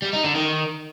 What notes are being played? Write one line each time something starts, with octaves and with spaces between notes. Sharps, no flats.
G3
D#4
D3
D#3